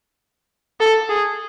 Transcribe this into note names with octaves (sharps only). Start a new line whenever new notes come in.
A4
G#4